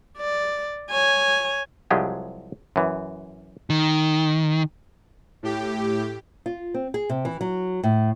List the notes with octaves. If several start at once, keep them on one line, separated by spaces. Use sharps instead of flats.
D5
C#5 G#5
C2 F3 F#3 G#3 G4 G#4
F#2 E3
D#3
A2 G4
F4
C4
G#4
C3
E3
F#3
A2